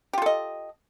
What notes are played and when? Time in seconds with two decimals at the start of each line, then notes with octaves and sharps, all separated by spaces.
0.13 G4
0.18 F4
0.22 A4
0.26 D#5